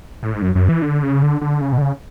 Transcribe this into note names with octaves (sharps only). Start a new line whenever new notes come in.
A2
G#2
F#2
F#2
E3
D3
C#3
D3
D3
C#3
B2
D3
C#3